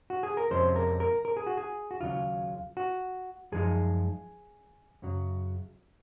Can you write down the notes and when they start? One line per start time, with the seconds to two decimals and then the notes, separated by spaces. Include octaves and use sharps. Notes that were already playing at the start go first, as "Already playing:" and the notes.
0.10 F#4
0.23 G#4
0.37 A#4
0.50 F2 C3 F3 G#3 C#4 C5
0.76 A#4
1.00 A#4
1.25 A#4
1.37 G#4
1.46 F#4
1.57 G#4
1.91 F#4
2.01 D#2 C#3 F#3 F4
2.77 F#4
3.52 F#2 F3 G#3 D#4 G#4
5.02 F#2 C#3 F#3